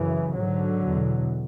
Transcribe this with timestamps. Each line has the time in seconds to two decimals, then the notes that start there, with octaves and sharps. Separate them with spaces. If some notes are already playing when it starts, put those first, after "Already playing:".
Already playing: F#2 C#3 E3
0.36 G#2 D3 F#3
0.84 E2 B2